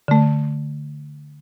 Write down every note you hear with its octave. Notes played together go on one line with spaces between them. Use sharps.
D3 A3